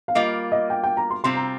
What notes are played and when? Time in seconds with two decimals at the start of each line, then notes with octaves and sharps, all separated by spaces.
0.08 F5
0.15 G3 A#3 F4 D#5
0.52 D#5
0.70 G5
0.84 G5
0.97 A#5
1.10 C6
1.24 C3 G3 C4 F4 C6
1.36 A#5